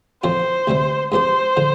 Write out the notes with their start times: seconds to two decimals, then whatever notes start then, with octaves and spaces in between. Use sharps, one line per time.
0.23 F2 F3 C4 F4 C5
0.67 D2 C3 G3 C4
1.12 G2 F3 C4 G4 C5
1.57 D3 F3